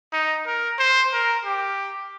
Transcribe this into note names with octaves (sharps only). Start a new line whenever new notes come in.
D#4
A#4
C5
A#4
G4